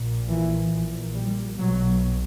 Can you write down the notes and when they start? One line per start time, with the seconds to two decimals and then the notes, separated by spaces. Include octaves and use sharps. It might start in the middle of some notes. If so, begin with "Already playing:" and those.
Already playing: A#1 A#2
0.29 E3
0.72 A#1 A#2
1.15 G3
1.58 B1 B2 F#3